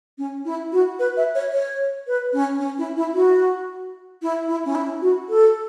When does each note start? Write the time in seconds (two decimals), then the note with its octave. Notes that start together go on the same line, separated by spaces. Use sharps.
0.18 C#4
0.45 E4
0.72 F#4
0.99 B4
1.17 E5
1.35 C#5
1.52 C#5
2.07 B4
2.33 C#4
2.60 C#4
2.78 E4
2.97 E4
3.14 F#4
4.22 E4
4.48 E4
4.65 C#4
4.75 E4
5.01 F#4
5.29 A4